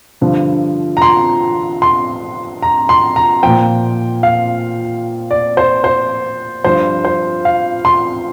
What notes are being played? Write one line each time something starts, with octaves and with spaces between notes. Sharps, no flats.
G2 D3 F3
A#5
C6
C6
A#5
C6
A#5
A#2 F3 G5
F5
D5
C5
C5
G2 F3 C5
C5
F5
C6